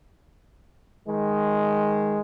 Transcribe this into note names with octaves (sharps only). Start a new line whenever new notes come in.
D#3 G#3